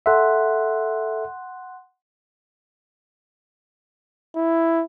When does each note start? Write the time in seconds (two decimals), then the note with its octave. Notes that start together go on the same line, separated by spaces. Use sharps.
0.06 A4 E5 F#5 C6 F#6
4.36 E4